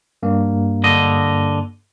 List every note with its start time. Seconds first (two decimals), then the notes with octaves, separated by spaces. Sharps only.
0.23 G2 A#3
0.84 D3 D#5